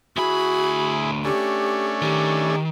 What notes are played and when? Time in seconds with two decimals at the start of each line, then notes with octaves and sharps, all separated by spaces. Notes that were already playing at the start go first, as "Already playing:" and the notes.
0.17 D2 E4 F#4 G#4 B5
1.25 A3 C#4 D4 G4
2.02 D#3 G4